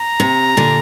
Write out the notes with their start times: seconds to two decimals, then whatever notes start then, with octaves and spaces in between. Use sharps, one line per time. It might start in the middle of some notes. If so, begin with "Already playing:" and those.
Already playing: A#5
0.20 C3
0.57 A#2 D3